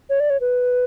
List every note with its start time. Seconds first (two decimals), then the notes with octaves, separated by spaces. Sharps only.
0.10 C#5
0.20 D5
0.30 C#5
0.41 B4